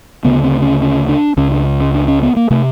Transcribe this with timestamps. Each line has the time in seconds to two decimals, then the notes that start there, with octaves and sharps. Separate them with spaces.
0.25 D2 C#3 B3
0.43 C4
0.62 C#4
0.82 C#4
1.09 D4
1.37 C#2 C#3 C#4
1.52 D4
1.80 C#4
1.94 D4
2.08 C#4
2.23 B3
2.36 A#3
2.50 C3 A3